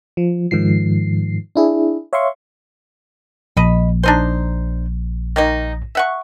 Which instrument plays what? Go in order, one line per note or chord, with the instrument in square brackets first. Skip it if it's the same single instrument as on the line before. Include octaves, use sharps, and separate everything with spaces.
[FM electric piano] F3
G#2 D#3 F3 C7
D4 E4 G#4
C#5 E5 F5 C6 C#6
[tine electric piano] A#1 [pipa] D#5 B5
[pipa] D4 D#4 C5
D#3 A#3 D#4
E5 F#5 C#6